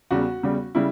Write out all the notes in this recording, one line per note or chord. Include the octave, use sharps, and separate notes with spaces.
E2 C#3 G3 F#4
E2 C#3 G3
C#3 G3 E4